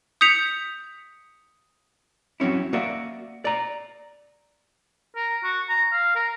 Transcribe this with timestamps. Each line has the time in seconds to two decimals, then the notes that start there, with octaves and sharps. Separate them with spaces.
0.21 D#6 G6 B6 C#7 F7
2.40 F#3 C4 C#4 E4
2.73 A#3 F#4 D5 E5
3.45 D5 A#5
5.16 A#4
5.43 F#4
5.69 A#5
5.92 F5
6.15 A#4